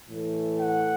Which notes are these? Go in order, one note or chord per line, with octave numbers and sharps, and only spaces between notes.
A2 E3 A3
F#5